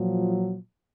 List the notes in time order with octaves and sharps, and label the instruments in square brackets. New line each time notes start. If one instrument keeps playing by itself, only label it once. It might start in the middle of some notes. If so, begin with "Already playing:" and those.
Already playing: [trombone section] A#2 F3 F#3